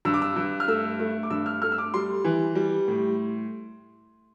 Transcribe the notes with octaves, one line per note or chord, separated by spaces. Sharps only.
G2 E6
D6
E6
G2
F6
A3 E6
A3
D6
G2 E6
F6
A3 F6
E6
D6
G3 C6
E3
G3
A2